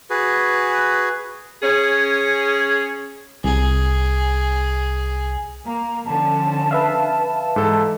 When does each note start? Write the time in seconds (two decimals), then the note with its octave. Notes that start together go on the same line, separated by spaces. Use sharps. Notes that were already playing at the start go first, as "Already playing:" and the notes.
0.10 F#4 G#4 B4
1.62 C#4 G#4
3.44 C2 G#4
5.66 A#3 A#5
6.06 D3 F3 C#4 A5
6.71 B4 E5 F5
7.56 G#2 E3 G#3 A4